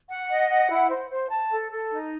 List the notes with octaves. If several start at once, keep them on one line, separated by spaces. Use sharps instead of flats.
F#5
D#5
F#5
E4
C5
C5
A5
A4
A4
D#4